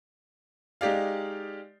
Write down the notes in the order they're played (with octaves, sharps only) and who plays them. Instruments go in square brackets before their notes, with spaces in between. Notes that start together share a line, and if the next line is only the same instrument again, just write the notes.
[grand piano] G#3 D#4 G4 D5 F5